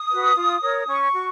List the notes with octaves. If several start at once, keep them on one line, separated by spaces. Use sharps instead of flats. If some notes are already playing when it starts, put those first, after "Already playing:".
Already playing: D#6
F#4 B4
F4
A#4 C#5
C#4 C#6
F#4